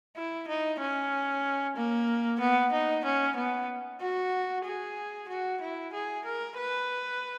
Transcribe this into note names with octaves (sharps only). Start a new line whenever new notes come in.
E4
D#4
C#4
A#3
B3
D#4
C#4
B3
F#4
G#4
F#4
E4
G#4
A#4
B4